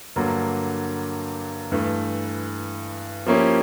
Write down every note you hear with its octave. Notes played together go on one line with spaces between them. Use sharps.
G2 D3 F#3 A#3
G2 E3 A3
F3 A#3 C#4 E4 G4